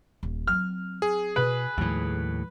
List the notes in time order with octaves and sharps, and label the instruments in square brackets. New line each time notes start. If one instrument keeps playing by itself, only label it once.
[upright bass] D#1
[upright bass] F#3 C4 [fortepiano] F6
[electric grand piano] G#4
[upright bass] B2 [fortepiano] B4
[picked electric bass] D#2 A2 [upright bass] F3 G3